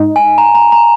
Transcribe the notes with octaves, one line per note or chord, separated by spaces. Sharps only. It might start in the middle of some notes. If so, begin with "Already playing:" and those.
Already playing: G#2 D#4
G#5
A#5
A#5
A#5